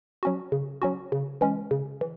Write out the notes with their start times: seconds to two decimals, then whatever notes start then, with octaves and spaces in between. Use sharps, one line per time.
0.23 F#3 C#4 F#4
0.52 C#3
0.82 F#3 C#4 F#4
1.12 C#3
1.41 E3 G#3 C#4
1.71 C#3
2.01 E3